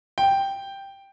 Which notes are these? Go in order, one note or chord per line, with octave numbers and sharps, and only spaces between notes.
G5